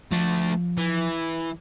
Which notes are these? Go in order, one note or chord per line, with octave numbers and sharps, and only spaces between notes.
F3 A3 D4
E3